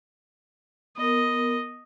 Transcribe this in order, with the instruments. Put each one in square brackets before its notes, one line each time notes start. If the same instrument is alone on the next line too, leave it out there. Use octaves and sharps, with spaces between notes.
[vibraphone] B3 A#4 [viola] D#5